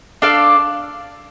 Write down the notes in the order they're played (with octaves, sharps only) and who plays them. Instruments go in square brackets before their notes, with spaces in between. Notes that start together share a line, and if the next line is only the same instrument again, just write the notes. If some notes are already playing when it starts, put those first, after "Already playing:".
[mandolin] D4 A4 D5 F5